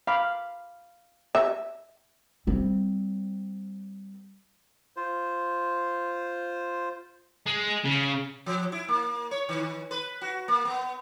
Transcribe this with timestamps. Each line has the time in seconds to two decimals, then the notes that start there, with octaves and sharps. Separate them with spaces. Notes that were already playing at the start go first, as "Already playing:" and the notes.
0.07 F5 B5 D6
1.35 E5
2.47 G3 C4
4.96 F4 C5
7.46 G#3
7.84 C#3
8.46 F3
8.72 E4
8.88 A#3
9.31 C#5
9.49 D#3
9.91 B4
10.21 F#4
10.48 A#3
10.65 B3